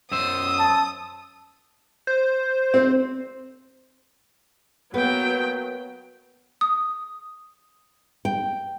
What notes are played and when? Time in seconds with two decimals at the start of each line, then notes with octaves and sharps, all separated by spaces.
0.11 F#2 C5 D#6 E6
0.59 A5
2.07 C5
2.74 C4
4.94 F#3 A#3 B3 B4 G5
6.61 D#6
8.25 G5